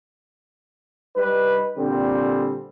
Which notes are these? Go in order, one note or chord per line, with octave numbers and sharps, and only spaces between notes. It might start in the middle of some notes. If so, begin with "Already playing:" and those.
G3 D#4 B4
A#2 D3 G3 C4